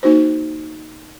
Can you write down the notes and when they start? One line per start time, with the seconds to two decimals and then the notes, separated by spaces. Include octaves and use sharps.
0.03 A#3 D#4 F#4 C5